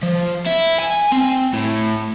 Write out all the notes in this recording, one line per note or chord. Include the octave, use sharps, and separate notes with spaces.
F3
E4
G#5
C4
A2